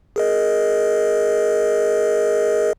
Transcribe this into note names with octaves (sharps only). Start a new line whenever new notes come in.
G#4 A#4 D#5